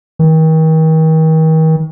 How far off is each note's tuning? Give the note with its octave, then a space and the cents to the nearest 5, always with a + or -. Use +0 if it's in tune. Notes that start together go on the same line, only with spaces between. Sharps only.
D#3 +40